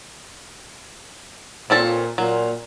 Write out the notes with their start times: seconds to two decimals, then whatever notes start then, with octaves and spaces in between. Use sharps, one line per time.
1.70 A#2 C4 C#4 A4
2.18 A#2 F#3